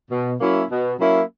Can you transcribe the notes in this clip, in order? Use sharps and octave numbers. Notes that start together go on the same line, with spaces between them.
B2
F#3 A#3 C#4 E4
B2
F#3 A#3 C#4 E4